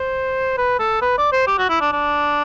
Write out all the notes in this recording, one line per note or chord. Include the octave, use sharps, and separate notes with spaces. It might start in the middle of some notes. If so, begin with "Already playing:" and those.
Already playing: C5
B4
A4
B4
D5
C5
G4
F#4
E4
D4
D4